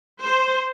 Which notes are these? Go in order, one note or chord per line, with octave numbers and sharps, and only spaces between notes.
C5